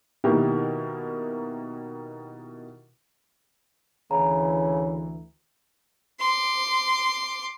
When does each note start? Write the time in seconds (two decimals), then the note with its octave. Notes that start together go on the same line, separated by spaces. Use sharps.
0.24 B2 D#3 A#3 E4 G4 A#4
4.11 D2 C#3 E3 A#5
6.20 C6 D6